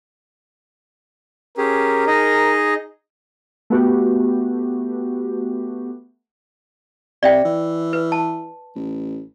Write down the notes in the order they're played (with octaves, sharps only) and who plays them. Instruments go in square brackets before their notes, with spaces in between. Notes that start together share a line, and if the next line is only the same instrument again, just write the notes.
[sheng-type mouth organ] C#4 G4 G#4 [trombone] A#4
[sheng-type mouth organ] D#4 G#4 D#5
[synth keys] A3 B3 F#4 G4
[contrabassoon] C3 [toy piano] D5 E5 G5
[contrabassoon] E3
[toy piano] B4
A5
[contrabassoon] A1